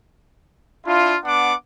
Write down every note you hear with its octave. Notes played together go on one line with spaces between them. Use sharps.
D4 E4 F4
B3 D4 F#5 D6